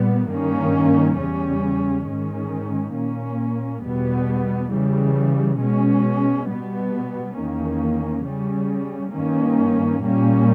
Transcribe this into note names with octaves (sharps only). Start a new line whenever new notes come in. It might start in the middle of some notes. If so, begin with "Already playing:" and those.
Already playing: A#2 G3 B3
G2 D#3 A#3 C#4
E2 C#3 G3 C#4
G#2 D#3 G#3 C#4
A#2 A#3 C#4
E2 B2 G3 B3
C#3 E3 G3
B2 G#3 C#4
B2 G3 B3
E2 D#3 A#3 C#4
C#3 G3 C#4
G2 D#3 A#3 C#4
A#2 G3 A#3 C#4